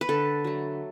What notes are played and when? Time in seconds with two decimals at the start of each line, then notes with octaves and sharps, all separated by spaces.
0.01 B4
0.09 D3 A4
0.44 F#3 A3